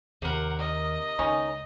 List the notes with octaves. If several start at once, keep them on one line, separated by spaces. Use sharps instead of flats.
D#2 C3 A#4 F#5
D#5
C#2 D#3 C#4 D#4